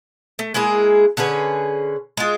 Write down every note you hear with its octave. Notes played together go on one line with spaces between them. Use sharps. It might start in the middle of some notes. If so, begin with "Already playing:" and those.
A3
G#3 A#3 E4 G#4
D3 C#4 G#4 B4
G#3 F4